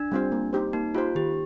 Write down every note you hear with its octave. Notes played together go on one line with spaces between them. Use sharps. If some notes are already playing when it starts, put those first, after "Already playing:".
Already playing: D4
G3 C4 F4 C5
A#3
D#4 G4 C5
A#3 D#4
D#4 F4 G4 C5
D#3 G4